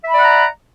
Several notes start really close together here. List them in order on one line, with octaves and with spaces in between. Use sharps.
E5 B5 D5 F#5 A#5